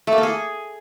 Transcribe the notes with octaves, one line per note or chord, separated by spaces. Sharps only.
A3
A#3
A4
G#4